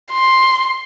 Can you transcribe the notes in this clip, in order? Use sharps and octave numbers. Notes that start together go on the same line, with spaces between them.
C6